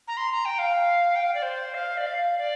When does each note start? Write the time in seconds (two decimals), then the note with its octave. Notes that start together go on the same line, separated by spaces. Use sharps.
0.08 A#5
0.17 C6
0.32 A#5
0.45 G5
0.59 F5
1.16 G5
1.24 F5
1.34 D5
1.42 C5
1.74 F5
1.97 D5
2.06 F5
2.38 D5